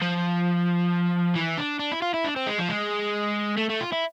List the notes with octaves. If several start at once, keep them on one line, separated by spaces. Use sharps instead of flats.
F3
E3
D4
D4
E4
F4
E4
D4
C4
G#3
F3
G#3
A3
A3
F4
E4